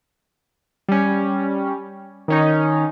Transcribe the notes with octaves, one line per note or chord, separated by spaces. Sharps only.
G3 C#4
D#3 C#4 D#4